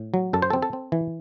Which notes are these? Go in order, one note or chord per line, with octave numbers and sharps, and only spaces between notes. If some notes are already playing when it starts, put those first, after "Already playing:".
Already playing: A2
F#3
F#2 A4
C5
A4
C4
A4
C4
E3